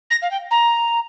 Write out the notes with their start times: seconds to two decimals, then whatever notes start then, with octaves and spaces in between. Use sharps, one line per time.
0.10 A#6
0.22 F5
0.31 G5
0.51 A#5